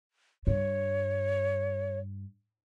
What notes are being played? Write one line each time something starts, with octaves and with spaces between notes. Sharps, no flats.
G2 C#5